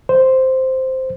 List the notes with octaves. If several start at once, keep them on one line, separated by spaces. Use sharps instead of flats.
C5